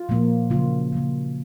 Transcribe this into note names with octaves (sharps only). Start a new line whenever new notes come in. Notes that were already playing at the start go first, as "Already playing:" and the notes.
Already playing: F4
A#2 F3 A#3
C#3 F#3 A#3 F4
C#3 F#3 A#3